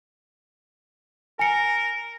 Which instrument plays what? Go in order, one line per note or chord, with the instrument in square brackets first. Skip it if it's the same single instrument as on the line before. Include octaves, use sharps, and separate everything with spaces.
[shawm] A#4 [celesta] G#5 C#7